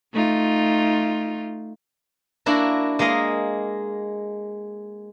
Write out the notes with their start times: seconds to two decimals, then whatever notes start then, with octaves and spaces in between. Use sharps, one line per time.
0.13 A3 D#4 F4
2.46 A#3 D4 E4 F#4
2.99 G#3 A#3 G#4 D#5 F5